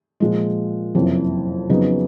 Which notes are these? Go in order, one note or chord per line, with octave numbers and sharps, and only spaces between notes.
A#2 F3 G#3
F#1 F2 C3 E3
F2 C#3 F#3 B3 D#4